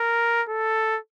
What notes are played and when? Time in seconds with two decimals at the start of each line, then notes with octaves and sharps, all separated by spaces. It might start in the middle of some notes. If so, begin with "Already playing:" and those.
Already playing: A#4
0.49 A4